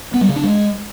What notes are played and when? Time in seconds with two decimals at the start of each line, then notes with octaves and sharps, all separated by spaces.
0.14 B3
0.21 G3
0.29 C#3
0.36 D4
0.44 G#3